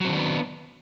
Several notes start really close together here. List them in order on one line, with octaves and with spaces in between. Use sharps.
F#3 C4 D#3 D4 B3